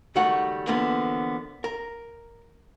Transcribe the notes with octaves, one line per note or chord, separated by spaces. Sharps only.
C#2 D#3 G3 A3 F#4 F#5
D3 E3 F3 A#3 B3
A#4